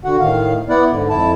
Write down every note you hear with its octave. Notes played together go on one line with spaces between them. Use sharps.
D3 F#4 F#5
A2 D#3 F5
B3 E4 D5 F#5
G#2 D3
F2 E4 A5